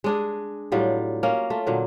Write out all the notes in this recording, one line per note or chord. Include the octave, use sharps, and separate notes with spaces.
G#3 D4 G#4
A2 F#3 G3 F4
A#3 C#4 A#4
A3 F4
A#2 D3 F#3